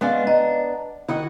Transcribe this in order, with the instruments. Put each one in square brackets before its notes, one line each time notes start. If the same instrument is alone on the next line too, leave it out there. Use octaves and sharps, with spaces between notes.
[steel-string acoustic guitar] G#3 C#4 F5 [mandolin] B3 D4
[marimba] D#5 [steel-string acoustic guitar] A#5
[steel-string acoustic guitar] D#3 E4 [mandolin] F#4 D#5 F#5